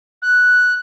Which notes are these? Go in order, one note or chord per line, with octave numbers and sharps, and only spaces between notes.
F#6